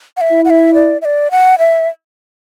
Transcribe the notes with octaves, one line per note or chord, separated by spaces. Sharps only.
F#5
E5
E4
F#5
E5
D5
E5
D5
F#5
E5